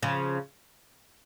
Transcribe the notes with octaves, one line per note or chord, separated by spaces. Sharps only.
C#3 F3